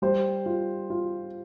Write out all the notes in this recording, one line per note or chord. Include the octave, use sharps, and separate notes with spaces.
G3 C5
F4
F4